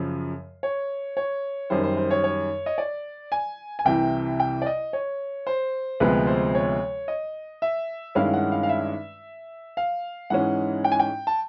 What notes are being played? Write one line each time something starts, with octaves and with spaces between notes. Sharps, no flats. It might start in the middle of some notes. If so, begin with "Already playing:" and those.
Already playing: F#2 C#3 F3
C#5
C#5
F#2 D#3 G3 C5
C5
C5
C#5
C#5
D#5
D5
G#5
G#5
C2 C3 E3 G5
G5
D5
D#5
C#5
C5
D2 C3 F3 G#3 B3 B4
C5
C#5
D#5
E5
G2 D#3 G#3 C#4 E4 F5
F#5
F5
F5
E5
F5
G#2 E3 G#3 C#4 F#5
G5
G#5
G5
A5